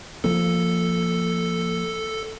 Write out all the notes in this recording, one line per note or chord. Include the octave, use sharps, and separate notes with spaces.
F3 A#3 A4